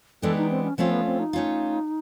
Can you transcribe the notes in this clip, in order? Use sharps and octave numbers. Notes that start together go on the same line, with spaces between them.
E3 G#3 B3 D4 G4 A4
D#4
C4
C#4
F3 A3 C4 C#4 F4
B3
C4
D#4
A3 C#4 F4